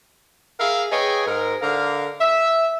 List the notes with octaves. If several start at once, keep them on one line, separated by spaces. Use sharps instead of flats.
G#4 A#4 E5 F5
G#4 B4 C#5 D#5 G5 G#5
G#2 A#4
D3 A#4 F5
E5